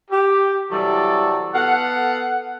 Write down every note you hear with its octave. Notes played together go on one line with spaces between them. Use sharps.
G4
C3 E3 F#3 G3 A4 D5
B3 A4 F5 F#5